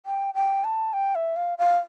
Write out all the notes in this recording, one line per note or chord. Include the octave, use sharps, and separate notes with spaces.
G5
G5
A5
G5
E5
F5
F5